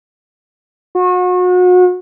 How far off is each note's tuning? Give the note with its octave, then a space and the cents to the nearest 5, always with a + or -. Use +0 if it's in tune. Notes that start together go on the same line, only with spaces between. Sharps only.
F#4 -35